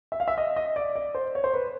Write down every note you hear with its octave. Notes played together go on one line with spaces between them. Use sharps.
E5
F5
E5
D#5
D#5
D5
D5
C5
C#5
C5
B4